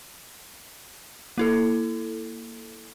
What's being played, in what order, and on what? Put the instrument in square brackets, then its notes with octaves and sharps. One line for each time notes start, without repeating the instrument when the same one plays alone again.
[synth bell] A#3 E4 A4